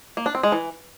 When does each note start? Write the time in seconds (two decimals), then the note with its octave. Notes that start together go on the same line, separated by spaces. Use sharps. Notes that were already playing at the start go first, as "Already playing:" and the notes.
0.17 A#3
0.26 D4
0.35 C4
0.43 G#3
0.52 E3